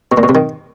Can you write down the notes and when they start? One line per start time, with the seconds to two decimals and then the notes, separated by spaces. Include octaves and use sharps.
0.12 B2
0.17 A#2
0.23 B2
0.29 C3
0.35 D#3